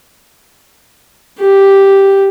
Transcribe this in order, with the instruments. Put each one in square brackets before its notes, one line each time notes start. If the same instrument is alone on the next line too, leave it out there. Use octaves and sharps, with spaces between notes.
[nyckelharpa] G4